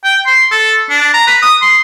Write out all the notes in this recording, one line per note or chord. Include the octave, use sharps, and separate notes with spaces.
G5
C6
A4
D4
A#5
B4
D#6
C6